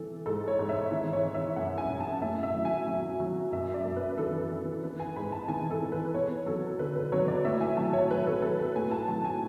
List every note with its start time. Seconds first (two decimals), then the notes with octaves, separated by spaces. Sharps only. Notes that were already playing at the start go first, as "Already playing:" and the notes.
Already playing: E3 A4
0.26 G#2 A4
0.48 C#5
0.59 G#2
0.69 E5
0.92 E3
1.13 C#5
1.23 E3
1.34 E5
1.56 F#2 F#5
1.78 G#5
1.89 F#2
2.00 A5
2.22 A2 E5
2.43 E5
2.54 F#3
2.65 G#5
2.87 F#3
3.20 F#3
3.52 F#2 E5
3.74 D5
3.85 F#2
3.96 B4
4.18 E3 A4
4.51 E3
4.83 E3 B4
5.00 G#5
5.16 G#2 B5
5.32 A5
5.48 E3 G#5
5.71 A4
5.82 E3
5.92 B4
6.14 E2 C#5
6.46 F#3 A4
6.79 D3 B4
6.96 B4
7.12 F#3 C#5
7.28 D5
7.45 A2 E5
7.61 G#5
7.77 F#3 A5
7.93 C#5
8.10 F#3 B4
8.27 A4
8.42 F#3 A4
8.59 B4
8.75 A2 G#5
8.91 A5
9.08 F#3 A5
9.25 G#5